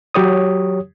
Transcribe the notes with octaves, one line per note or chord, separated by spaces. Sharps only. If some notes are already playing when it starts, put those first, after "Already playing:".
F#3 G4 C#5 D#6